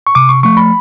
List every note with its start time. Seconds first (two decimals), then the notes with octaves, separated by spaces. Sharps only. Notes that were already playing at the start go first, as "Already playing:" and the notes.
0.07 C#6
0.15 C3 D6
0.29 C#6
0.43 F3 A3 C#6
0.57 B5